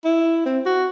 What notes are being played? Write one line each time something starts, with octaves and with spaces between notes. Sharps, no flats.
E4
C4
F#4